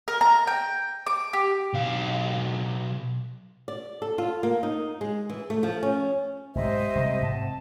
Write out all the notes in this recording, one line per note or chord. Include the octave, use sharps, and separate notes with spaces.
A#4
A#5
G5
D6
G4
B1 F5
D5
A4
F4
A#3
D#4
G#3
E3
A3
F3
C#4
B1 G#2 G#3 G4 C5 D#5 E5
C3 G3 G#3
G#2 C3 A5